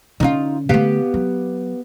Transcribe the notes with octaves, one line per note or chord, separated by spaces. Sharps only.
D3 C#4 D#4 F4
D3 A3 B3 G4 F5
F#3